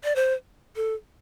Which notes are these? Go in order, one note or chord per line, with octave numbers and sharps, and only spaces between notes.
D5
C5
A4